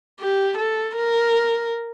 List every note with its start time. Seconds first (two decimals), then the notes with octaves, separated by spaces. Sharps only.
0.20 G4
0.58 A4
0.96 A#4